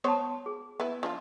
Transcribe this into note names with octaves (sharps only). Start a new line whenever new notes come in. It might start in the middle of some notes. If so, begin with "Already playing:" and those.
B3 C5 C#5 A5 D#6
G#4
B3 E4
F3 D4 F4